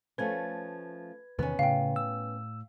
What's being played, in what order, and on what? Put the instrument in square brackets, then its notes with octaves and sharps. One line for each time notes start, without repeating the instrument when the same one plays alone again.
[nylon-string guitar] F3 A3 C#4 [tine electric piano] B4 G#6
[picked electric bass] E2 C3 D#3 [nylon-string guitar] B3 C#4
[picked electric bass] A2 [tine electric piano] C#3 [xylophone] F5 G5
[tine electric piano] E6